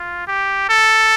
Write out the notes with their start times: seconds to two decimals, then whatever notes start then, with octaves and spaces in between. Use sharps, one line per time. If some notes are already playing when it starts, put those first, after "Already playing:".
Already playing: F4
0.27 G4
0.69 A4